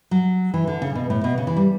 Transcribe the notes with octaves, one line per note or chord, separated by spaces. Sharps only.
F#3
E3
D3
C#3
B2
A2
B2
C#3
E3
G3